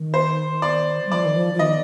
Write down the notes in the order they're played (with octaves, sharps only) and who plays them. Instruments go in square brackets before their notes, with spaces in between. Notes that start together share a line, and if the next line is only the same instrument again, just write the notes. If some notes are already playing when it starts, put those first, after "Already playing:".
Already playing: [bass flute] D#3
[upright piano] C5
D5
[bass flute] G3
[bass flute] F3 [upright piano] D5
[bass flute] D#3
F3
F3
[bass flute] D#3 [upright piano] D#5